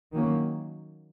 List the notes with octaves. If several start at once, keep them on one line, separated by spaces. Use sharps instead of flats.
D#3 F#3 A#3 C#4